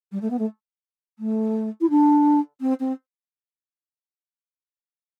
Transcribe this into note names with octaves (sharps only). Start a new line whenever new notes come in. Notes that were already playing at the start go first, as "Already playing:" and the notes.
G3
A3
B3
A3
A3
E4
D4
C4
C4